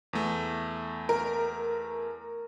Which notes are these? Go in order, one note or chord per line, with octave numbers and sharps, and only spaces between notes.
E2 A3
A#4